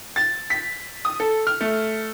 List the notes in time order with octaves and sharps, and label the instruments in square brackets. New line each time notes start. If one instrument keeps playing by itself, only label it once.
[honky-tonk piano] A6
B6
D#6
A4
F6
A3